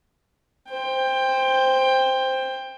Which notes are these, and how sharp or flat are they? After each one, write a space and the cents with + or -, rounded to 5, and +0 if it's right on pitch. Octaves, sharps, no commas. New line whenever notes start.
C5 +0 G5 +20